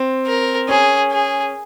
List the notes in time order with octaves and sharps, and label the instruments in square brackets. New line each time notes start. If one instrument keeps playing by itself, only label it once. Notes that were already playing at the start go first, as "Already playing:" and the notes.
Already playing: [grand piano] C4
[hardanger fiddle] A#4
[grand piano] C#4 [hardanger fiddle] G#4
[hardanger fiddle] G#4